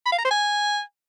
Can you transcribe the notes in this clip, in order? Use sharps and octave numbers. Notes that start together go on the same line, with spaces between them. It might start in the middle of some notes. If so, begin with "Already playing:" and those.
B5
F5
A#5
C5
G#5